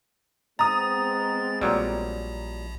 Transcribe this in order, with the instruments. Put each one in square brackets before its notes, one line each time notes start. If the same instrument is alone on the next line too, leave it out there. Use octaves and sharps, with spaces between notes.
[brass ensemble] G#3 B3 C4 [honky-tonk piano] A#5 D#6 [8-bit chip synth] A6
[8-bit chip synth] A#1 [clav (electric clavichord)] A#2 F#3 G3